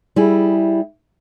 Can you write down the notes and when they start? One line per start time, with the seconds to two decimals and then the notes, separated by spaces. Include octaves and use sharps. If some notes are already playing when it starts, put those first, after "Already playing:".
0.16 G3 E4 G#4